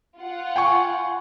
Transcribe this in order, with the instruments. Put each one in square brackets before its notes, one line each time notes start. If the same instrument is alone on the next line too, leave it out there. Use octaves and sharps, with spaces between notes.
[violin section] F4 F#5
[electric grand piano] G5 G#5 C#6